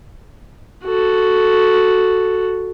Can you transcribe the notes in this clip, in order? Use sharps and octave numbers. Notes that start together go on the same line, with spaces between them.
F#4 A4